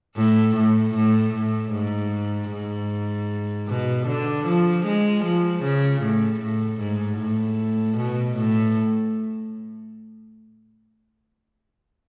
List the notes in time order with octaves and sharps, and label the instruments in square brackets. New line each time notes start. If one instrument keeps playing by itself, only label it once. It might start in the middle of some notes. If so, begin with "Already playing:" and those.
[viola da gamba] A2
A2
A2
A2
G#2
G#2
B2
D3
F3
G#3
F3
C#3
A2
A2
G#2
A2
B2
A2